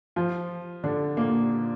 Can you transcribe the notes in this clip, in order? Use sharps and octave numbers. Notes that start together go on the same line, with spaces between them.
F3 F4
D3 D4
A#2 A#3